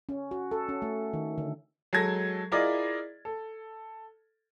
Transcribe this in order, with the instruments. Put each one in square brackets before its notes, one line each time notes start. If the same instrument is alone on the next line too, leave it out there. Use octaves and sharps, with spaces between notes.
[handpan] C#4
F#4
A4
C#4
A3
D#3
D3
[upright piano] F#3 G#3 A4 G#6 A#6
E4 F4 G#4 A#4 D5 D#5
A4